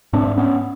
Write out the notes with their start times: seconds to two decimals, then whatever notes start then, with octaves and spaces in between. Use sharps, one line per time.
0.13 G#2 C4 D4
0.38 B3 C#4